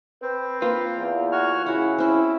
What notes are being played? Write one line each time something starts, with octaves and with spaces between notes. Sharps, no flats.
C4 B4
A#3 F4 B4 C6
E2
F#4 C#5 F6
C#3 E4 F#4 F#5
C4 C#4 E4